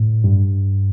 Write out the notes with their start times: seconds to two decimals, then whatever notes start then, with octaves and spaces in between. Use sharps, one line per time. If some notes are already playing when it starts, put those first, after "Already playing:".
Already playing: A2
0.24 G2